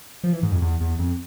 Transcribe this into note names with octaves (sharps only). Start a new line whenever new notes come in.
F3
E3
G#2
F2
E2
E2
F2